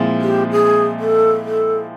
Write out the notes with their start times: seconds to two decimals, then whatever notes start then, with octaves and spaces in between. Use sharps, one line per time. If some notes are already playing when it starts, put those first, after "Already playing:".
Already playing: A#2 F3 G#3 C4 E4
0.22 G4
0.52 G#4
0.99 A4
1.45 A4